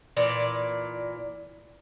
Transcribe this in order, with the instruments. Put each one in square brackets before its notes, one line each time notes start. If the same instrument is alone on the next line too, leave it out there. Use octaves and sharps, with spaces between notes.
[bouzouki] A#2 E3 D5